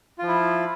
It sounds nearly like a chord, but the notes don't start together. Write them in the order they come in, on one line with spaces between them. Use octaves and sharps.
F4 F3 E4